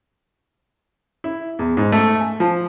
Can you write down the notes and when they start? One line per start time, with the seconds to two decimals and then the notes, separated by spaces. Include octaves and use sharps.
1.24 E4
1.59 E2
1.77 G#2
1.92 A3
2.20 G#5
2.40 F3